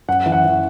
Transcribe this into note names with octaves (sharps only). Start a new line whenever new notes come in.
F#2 F#5
E3
F#5
E3